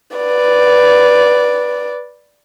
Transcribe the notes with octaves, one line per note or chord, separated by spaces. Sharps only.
B4 D5